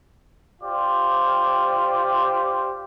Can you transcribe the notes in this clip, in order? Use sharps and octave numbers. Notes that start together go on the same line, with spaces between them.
F4 G4 C5 D5